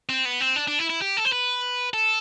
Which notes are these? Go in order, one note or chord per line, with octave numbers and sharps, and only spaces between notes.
C4
B3
C4
D4
D4
E4
E4
G4
A4
C5
B4
A4